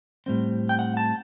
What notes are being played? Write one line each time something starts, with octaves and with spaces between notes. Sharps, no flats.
A2 G3 C4
G5
F#5
A5